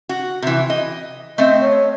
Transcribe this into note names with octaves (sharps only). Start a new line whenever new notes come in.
F#4
C3 E3
D#5
A3 C4 D#5
C#5